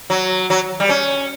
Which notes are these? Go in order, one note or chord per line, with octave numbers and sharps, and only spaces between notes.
F#3
F#3
G3
C#4